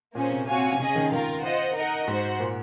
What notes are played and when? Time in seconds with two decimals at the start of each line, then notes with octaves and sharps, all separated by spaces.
0.15 A#2 A#3 C#4 G#4 C5
0.31 C3
0.48 C4 F#4 C#5 F5 G#5
0.73 C3
0.79 C#3 C#4 G#4 D#5
0.95 D#3
1.11 D#3 F4 A#4 F5
1.44 F4 C5 D#5 F#5
1.75 D#4 A#4 D#5 F#5
2.08 G#2 F#4 C5 F#5
2.40 A#2